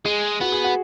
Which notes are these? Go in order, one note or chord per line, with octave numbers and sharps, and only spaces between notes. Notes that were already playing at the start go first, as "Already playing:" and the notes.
G#3 G#4
B3 F#4
G#4
F#4